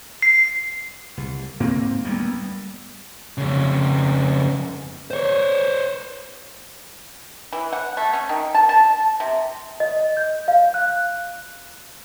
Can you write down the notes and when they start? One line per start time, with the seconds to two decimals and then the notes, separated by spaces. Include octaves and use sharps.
0.22 C7
1.17 C2
1.60 G#2 A#3 C4
2.05 D2 G3 A#3 B3
3.38 F2 C#3
5.11 C5 C#5
7.52 E3
7.72 F#5
7.97 A3
8.13 C#4
8.29 D#3
8.54 A5
8.69 A5
9.20 C3
9.80 D#5
10.17 G6
10.48 F5
10.74 F#6